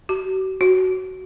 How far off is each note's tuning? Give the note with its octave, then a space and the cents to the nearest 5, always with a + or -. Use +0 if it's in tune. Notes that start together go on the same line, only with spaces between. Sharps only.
F#4 +40
F#4 +10